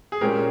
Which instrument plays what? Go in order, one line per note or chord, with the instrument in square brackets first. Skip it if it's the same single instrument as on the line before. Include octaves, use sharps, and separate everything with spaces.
[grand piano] G#4
A#2 G#3 C#4 G4 A#4